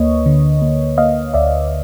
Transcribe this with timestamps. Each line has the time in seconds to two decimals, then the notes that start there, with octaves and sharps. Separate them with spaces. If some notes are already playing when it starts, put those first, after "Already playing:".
Already playing: D2 A#3 B4 C#5 D#5
0.26 D3
0.62 A#3
0.98 A#3 D#5 F5
1.34 D2 D5 E5